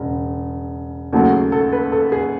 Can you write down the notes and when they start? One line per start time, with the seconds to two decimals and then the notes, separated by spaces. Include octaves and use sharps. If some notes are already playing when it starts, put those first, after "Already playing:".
Already playing: E1 C#3
1.13 D#2 C#3 F#3 A3 F#4
1.32 G#4
1.52 A4
1.73 B4
1.92 A4
2.12 G#4